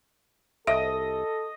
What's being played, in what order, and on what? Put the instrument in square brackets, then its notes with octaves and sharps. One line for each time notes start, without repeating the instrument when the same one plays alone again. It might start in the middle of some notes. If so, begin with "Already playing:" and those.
[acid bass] C2 [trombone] A4 [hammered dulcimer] D#5 [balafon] E5